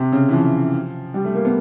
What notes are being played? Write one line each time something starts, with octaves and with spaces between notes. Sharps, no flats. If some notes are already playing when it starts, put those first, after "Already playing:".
Already playing: C3
C#3
E3
F3
G3
A3
A#3
B3